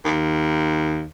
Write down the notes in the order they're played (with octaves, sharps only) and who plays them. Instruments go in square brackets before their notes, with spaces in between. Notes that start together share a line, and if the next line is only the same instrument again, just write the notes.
[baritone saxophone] D#2